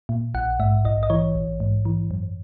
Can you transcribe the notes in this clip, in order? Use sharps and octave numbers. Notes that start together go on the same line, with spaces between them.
A#2
A#1 F#5
G#2 E5
A#1 D#5
D#5
E3 C#5
A#1
G#2
E3
F#2